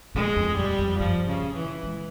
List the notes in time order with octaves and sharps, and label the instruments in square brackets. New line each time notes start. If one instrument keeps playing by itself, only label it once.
[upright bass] A#2 [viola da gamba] G#3
[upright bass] F2
[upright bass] E2 [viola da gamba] G3
[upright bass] F2
[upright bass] G2 [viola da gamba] F3
[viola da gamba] C#3
[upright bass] A#2
[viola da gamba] E3
[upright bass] G#3